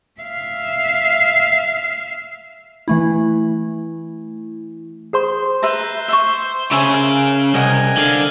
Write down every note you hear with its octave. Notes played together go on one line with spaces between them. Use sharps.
E5 F5
E3 A3 E4
G#4 C5 C6
B4 C5 E5 A#5
E5 C6 C#6
C#3 G#4 C#5 E5
A#4
C2 A#4 D#5 F#5 G#5
D3 F5